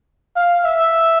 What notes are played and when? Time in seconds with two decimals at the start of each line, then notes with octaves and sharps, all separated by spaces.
0.36 F5
0.65 E5